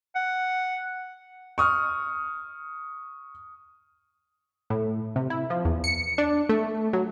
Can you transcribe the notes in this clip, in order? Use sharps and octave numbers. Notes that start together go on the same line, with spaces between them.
F#5
C#6 D#6 F6
A2
C3
E4
F3
E2
C#7
D4
A3
F#3